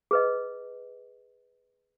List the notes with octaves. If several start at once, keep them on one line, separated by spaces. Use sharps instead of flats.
G#4 B4 D#5